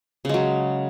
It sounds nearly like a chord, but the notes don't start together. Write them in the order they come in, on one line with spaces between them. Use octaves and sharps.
C#3 G#3 F#3